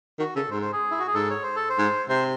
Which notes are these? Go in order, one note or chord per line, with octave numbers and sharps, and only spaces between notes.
D#3 F#4
C#3 A4
G#2 C5
C5
G#4
E4
F#4
G#4
G#2 A4
C#5
C5
A4
C5
G#2
C3 C5